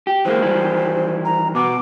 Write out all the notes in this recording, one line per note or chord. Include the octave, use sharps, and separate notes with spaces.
G4
E3 G#3 A#3 C5
D#3 E3 G3
A#5
B2 B3 D6